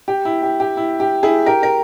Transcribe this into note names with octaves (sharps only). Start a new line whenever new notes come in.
G4
E4
G4
G4
E4
G4
E4 G#4
G4 A#4
A#4